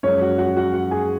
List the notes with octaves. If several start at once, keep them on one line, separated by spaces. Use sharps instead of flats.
F#2 F3 G#3 C#4 C#5
F#4 F#5
F#4 F#5
F#4 F#5
F#4 F#5
G#4 G#5